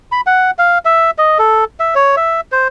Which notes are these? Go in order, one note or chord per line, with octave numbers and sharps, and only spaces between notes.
B5
F#5
F5
E5
D#5
A4
E5
C#5
E5
C5